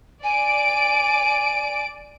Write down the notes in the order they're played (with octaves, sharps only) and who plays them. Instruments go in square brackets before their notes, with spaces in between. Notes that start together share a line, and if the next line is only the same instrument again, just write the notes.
[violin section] D5 D7 [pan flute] G#5